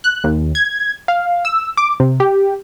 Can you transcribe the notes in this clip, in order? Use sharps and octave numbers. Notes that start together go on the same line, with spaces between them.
F#6
D#2
G#6
F5
E6
D6
C3
G4